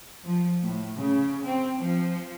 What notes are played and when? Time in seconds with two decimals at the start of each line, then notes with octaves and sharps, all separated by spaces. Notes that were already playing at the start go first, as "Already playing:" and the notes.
0.24 F3
0.63 A2
0.98 C#3
1.46 C4
1.81 F3